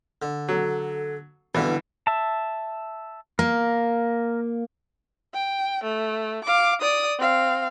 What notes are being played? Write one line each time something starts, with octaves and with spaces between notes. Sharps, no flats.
D3
F#3 A4
G2 B2 D3 E3 E4
E5 A5
A#3 A#4
G5
A3
F5 D6
D5 D#6
C4 F5